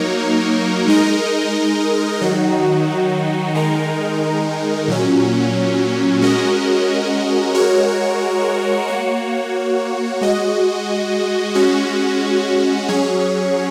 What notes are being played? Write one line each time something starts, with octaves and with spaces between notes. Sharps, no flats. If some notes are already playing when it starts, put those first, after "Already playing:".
Already playing: F#3 A#3 D#4 A#4 C#5
G#3 D#4 A#4 D#5
D#3 F#3 D#4 F#4
D#3 G#3 D#4 A#4
A#2 F#3 C#4
G#3 C#4 F#4 A#4 D#5
G#3 F#4 A#4 C#5
A#3 F#4 C#5
G#3 F#4 D#5
G#3 C#4 F#4
F#3 C#4 G#4 C#5